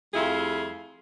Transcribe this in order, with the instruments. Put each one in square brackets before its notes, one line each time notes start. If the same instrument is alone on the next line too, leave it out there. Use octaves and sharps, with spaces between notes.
[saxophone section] F2 G3 A3 E4 F4 G#4